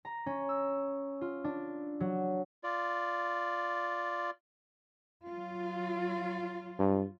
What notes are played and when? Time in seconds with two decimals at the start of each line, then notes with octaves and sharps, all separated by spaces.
0.05 A#5
0.26 C#4
0.49 E6
1.21 F4
1.44 D4
2.00 F#3
2.64 F4 D5
5.27 F#3 F4
6.79 G2